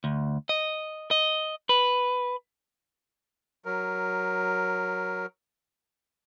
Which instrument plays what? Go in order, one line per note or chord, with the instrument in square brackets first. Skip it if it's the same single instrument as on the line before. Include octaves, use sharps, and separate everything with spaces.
[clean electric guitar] D2
D#5
D#5
B4
[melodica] F#3 A#4